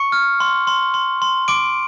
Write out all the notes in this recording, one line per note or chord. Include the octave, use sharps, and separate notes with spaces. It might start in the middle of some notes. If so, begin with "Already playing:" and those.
Already playing: C#6 C#7
F6
C6
C6
C6
C6
C6 D6 D7